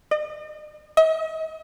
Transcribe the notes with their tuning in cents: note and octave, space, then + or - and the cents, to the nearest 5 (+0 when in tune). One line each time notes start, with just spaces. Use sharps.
D#5 -45
D#5 +45